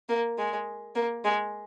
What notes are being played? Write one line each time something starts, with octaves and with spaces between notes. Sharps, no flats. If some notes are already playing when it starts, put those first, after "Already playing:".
A#3
G#3
A#3
G#3